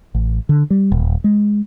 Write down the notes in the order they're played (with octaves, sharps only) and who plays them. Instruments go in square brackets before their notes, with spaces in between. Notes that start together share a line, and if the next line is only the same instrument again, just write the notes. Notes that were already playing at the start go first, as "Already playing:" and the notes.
[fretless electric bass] A1
D3
G3
D#1
G#3